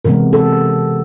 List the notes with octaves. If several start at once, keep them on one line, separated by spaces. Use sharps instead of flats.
C3 E3 G#3 B3 A#4
A4